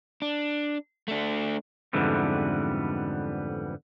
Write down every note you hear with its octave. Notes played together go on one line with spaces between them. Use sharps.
D4
A3 D4
F2 G#2 D3 E3 G3 B3